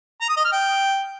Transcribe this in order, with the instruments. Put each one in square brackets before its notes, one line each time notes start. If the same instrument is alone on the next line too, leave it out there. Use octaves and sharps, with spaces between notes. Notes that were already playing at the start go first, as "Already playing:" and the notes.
[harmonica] A#5
D#6
D#5
F6
G5